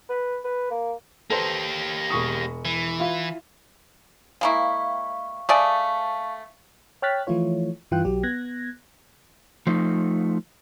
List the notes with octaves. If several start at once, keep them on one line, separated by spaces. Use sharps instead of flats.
B4
B4
A#3
A#3 G4 A4 B4 C5
E1 C#6 D#6
E3
E4 F4
G#3 A#3 E4 F5 C#6
A3 G#4 D5 F5 A5 C#6
C#5 G5 F6 F#6 A6 B6
E3 F3 A3 E4 F4 C#5
G2 E3 F4 G5 F#6
B1 F#3 G4
B3 F#6 G#6 A#6
F3 A3 D#4